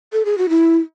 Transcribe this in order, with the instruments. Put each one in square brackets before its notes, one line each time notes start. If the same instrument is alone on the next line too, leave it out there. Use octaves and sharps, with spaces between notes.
[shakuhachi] A4
G#4
F#4
E4